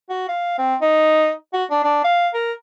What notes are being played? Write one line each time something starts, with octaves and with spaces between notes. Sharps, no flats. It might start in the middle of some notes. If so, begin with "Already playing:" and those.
F#4
F5
C4
D#4
F#4
D4
D4
F5
A#4